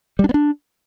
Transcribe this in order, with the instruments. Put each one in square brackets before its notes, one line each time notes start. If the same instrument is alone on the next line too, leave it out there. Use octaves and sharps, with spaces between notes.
[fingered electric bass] G3
D4
B3
D4